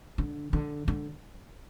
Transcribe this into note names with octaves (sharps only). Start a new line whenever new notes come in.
D3
D3
D3